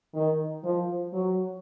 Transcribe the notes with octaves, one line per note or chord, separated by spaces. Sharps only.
D#3
F3
F#3